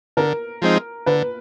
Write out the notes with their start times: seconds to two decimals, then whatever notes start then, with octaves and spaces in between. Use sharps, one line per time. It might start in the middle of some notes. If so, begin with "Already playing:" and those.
0.17 D3 A#4
0.62 F3 G#3 C4 D#4
1.06 D3 B4